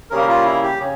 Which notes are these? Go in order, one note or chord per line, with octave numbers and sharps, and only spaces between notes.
C#3 G3 A#3 A#4
F4
E4
G4
C#3